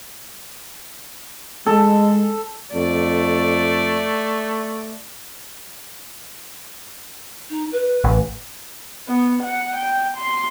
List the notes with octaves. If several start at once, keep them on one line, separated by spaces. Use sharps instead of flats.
G#3 A4
F2 A3 D5
D#4
B4
A1
B3
F#5
G5
C6